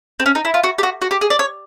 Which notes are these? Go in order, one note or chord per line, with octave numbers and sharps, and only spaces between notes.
C4
C#4
D#4
E4
F4
F#4
G4
F#4
F#4
G4
G#4
D5
C#5